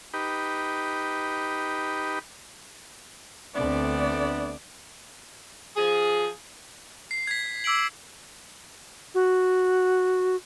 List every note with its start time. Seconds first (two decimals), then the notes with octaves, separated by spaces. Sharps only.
0.13 D#4 G4 B4
3.55 D2 A3 B3 C4 D4 D5
5.76 F3 G#4
7.11 C7
7.27 G#6 B6
7.64 D6 E6 B6 D7 F#7
9.15 F#4